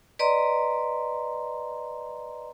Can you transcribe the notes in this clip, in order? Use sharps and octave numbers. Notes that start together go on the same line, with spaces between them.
B4 D5 D#5 A#5 C6